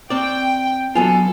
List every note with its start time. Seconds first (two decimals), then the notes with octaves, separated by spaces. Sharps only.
0.10 C4 D5 G5
0.95 F#3 B3 F4 A4 G#5